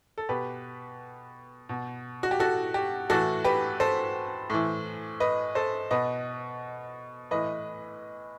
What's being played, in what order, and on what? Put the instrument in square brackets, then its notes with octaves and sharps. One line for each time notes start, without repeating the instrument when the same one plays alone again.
[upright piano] A4
B2 G4 B4
B2
F#4
G4
F#4 A4
G4
A2 E3 F#4 A4
G4 B4
A4 C5
A2 E3
B4 D#5
A4 C5
B2 B4 D#5
A2 E3 B4 D#5